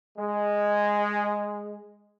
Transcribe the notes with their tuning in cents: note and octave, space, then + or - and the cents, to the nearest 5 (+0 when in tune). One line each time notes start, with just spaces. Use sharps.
G#3 -5